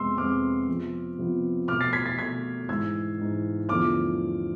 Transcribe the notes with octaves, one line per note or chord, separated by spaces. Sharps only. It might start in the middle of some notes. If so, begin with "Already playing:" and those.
Already playing: F2 C3 G#3 B3 C6 E6
F2 C3 G#3 B3 D6 F6
C3 F3 B3
C3 F3 B3
B2 A3 D6 F6
A6 C7
G#6 B6
A6 C7
B2 A3 G#6 B6
G#2 E3 G#3 E6 G#6
G#2 E3 G#3
E2 D3 F3 A3 D6 F6